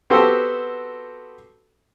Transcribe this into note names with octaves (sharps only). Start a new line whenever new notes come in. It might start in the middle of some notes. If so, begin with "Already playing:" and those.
B3 C4 F#4 G4 A4 C5